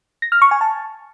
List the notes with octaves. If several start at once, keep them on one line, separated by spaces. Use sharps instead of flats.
A#6
F6
C#6
G#5
A5